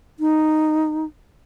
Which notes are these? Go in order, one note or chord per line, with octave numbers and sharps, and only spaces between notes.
D#4